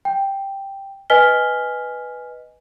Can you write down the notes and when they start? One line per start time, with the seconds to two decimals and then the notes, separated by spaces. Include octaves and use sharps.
0.05 G5
1.10 B4 D#5 G#5 F6 B6 G7